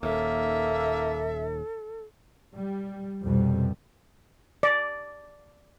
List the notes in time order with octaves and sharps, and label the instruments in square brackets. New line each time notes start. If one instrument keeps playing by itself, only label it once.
[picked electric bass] D#1 D#2 [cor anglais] A#3 [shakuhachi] A4 [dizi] E5
[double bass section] G3
C2 F2 B2 G3
[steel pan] D5